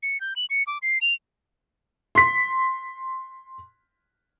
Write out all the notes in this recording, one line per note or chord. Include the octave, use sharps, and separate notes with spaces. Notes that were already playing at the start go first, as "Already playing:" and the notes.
C#7
G6
F#7
C#7
D6
C7
F7
C6 B6